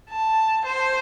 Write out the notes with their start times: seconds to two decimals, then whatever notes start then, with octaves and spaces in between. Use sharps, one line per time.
0.10 A5
0.66 C5